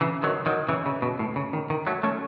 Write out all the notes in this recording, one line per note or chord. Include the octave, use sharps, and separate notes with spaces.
C#3 E3
D#3 F#3
D#3 F#3
C#3 E3
C#3
B2
A2
C#3
D#3
D#3
F#3 A3
A3 C#4